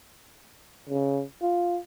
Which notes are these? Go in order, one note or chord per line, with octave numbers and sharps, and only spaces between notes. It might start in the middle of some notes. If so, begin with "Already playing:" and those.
C#3
F4